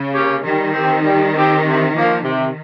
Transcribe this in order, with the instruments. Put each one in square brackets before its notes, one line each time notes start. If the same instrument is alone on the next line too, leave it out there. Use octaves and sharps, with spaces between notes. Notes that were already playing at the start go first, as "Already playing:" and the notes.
Already playing: [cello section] C#3
[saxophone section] A#3 C#4 G4 C#5
[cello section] D#3 [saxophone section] G3
[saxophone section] C4 G4
G3
C4 G4
C3
F3 A#3
C3